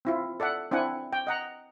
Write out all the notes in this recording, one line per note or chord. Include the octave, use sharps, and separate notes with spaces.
C4 E4 F4
A4 D5 E5 F#5
C4 D4 E4 F#5 G#5
G5
D#5 F#5 A#5